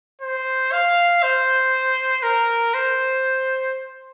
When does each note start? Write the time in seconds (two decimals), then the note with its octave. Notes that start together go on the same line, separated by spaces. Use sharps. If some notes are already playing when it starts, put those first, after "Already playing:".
0.21 C5
0.72 F5
1.22 C5
2.23 A#4
2.74 C5